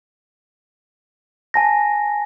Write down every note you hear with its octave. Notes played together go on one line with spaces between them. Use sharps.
G#5 A5 A#6